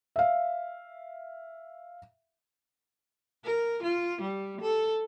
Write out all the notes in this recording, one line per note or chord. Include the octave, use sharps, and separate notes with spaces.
E5 F5
A#4
F4
G3
A4